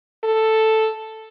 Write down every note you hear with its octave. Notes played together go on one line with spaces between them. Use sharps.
A4